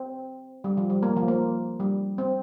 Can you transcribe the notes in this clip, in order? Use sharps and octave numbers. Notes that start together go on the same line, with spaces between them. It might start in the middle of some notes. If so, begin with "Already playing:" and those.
Already playing: C4
G3
F3
G3
A#3
F3
A#3
G3
C4